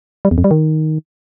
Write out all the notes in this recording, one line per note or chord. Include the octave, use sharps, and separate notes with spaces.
G3
E2
F2
G3
D#3